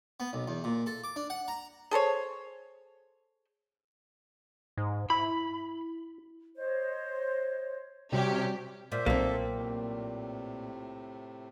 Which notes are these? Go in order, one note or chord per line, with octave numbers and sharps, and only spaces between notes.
B3
B1
E2
A#2
A4
D6
D4
F#5
A#5
G#4 A4 C5 C#5
G#2
E4 B5
C5 C#5 D#5
C3 G3 C#4 F#4 G4 D5
A#2 C5 E5
B1 A#3 C4 A4 E5
A2 C3